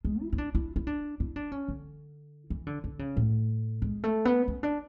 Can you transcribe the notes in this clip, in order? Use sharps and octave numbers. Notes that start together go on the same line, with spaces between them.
G#3
E4
E4
D4
E4
E4
D4
E4
D4
C#4
D3
E3
D3
D3
C#3
A2
G#3
A3
B3
C#4
D4